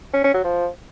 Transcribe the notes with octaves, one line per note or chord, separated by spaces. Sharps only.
C#4
C#4
F#3
F3